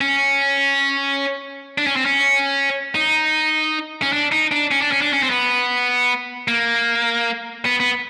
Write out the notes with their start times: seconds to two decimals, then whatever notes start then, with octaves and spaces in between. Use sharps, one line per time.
0.01 C#4
1.78 D4
1.87 C#4
1.96 C4
2.06 C#4
2.95 D#4
4.02 C#4
4.13 D4
4.32 D#4
4.52 D4
4.71 C#4
4.82 D4
4.92 C#4
5.02 D4
5.13 C#4
5.23 C4
5.30 B3
6.48 A#3
7.65 B3
7.80 B3